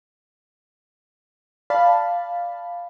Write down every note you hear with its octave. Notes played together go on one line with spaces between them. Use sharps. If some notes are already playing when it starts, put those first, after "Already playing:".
D5 F5 A5 B5